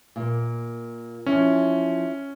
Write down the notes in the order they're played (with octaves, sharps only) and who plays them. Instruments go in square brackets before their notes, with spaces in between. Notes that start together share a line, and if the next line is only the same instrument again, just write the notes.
[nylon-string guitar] A#2 A#3
[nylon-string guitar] E3 F3 [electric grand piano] C#4